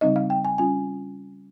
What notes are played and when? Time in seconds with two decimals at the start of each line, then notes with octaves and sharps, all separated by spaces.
0.01 C#3 G3 C4 D#4 D#5
0.16 F5
0.30 G5
0.45 G#5
0.58 G3 C#4 F4 G#5